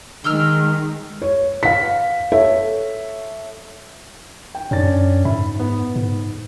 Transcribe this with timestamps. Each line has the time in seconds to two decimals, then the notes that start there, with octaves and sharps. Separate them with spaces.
0.24 D#3 G#3 G5 E6 F6
1.22 C#5
1.63 F5 B6
2.32 A4 C#5 E5
4.55 G5
4.71 F#2 C#4 D4 A6
5.25 G#2 E5 B5
5.59 B3
5.96 G#2